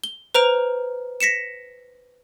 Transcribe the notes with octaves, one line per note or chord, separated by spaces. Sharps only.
G7
B4 C5 A#5 F6 D7 F7
A#6 B6 C#7 E7